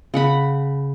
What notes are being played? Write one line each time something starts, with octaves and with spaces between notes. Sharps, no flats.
C#3 F#5 B5